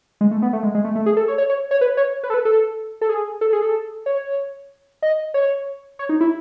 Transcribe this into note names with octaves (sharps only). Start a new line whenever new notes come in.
G#3
A3
B3
A3
G#3
G#3
A3
A3
G#4
A4
C#5
C#5
C#5
C#5
B4
C#5
B4
A4
B4
A4
A4
G#4
A4
G#4
A4
C#5
D#5
C#5
C#5
D#4
E4